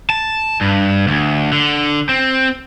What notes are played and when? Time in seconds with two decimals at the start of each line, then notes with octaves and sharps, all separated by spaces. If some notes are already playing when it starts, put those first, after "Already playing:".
0.10 A5
0.61 G2
1.07 D2
1.53 D3
2.09 C4